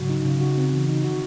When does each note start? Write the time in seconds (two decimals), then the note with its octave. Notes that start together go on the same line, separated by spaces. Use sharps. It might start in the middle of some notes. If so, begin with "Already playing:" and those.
Already playing: G#2 C#3 F#3 F#4
0.09 D#4
0.25 C#3
0.41 D#4 F#4
0.58 C4
0.72 E3
0.89 D#4
1.04 D#3 F#4